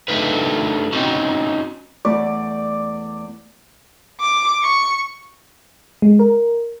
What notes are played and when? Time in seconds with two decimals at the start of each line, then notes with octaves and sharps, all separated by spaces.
0.08 A3 D4 D#4 A#4 B4
0.93 C4 C#4 D#4 F#4
2.05 E2 A3 D5 B5
4.20 D6
4.63 C#6
6.02 G#3
6.19 A#4